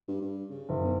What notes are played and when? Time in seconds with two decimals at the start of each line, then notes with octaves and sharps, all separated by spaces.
0.08 G2
0.21 G2
0.50 C#3
0.69 F#1
0.84 B1